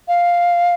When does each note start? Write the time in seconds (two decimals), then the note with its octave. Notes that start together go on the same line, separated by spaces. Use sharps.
0.08 F5